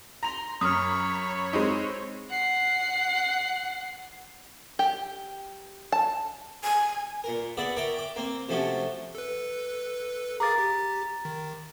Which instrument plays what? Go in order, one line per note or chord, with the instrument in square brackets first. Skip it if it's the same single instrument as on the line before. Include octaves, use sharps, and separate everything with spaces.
[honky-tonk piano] A#5 F7 [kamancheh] C6
[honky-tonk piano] F#2 [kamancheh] C#5 B5 [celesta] D#6 F6
[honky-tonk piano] G#3 C4 D#4
[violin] F#5 C7
[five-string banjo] G4
A5
[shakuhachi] G#5
[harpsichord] A#2 A#4
B3 G#4 D5 E5 F#5
A#4 C#5 D5 E5 G5
G5 D6
A#3 C4
C3 F3 A3 C#4 F#4 G4
[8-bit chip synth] A4 B4
[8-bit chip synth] G#4 A#4 F5 [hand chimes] A#5 D6 A6
[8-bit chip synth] G4
D#3